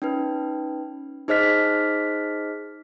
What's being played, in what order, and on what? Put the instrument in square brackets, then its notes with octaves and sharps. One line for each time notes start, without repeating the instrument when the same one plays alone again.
[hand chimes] C#4 D#4 B4
D#4 G#4 C5 D#5 F6 B6